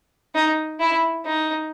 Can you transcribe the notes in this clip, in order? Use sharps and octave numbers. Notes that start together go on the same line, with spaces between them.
D#4
E4
D#4